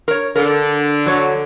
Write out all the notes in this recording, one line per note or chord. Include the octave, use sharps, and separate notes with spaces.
A#4 C#5
D3 A#4
F#3 C#5